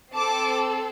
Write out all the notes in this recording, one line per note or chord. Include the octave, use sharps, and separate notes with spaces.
C4 A4 A5 D6